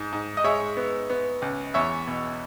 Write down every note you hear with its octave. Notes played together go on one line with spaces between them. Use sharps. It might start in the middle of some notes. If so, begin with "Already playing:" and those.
Already playing: G#2
G#2
D#5
G#3 C#5 E5
B3
B3
C#2
E2 C#5 E5
B2